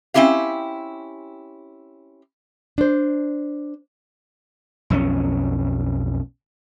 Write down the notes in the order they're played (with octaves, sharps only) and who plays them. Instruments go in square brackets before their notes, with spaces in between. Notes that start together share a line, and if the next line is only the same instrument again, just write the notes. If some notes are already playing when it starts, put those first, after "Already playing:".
[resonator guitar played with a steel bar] C4 C#4 E4 G4 F5
[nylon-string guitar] D4 C5
[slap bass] B1 F2 F3 C#4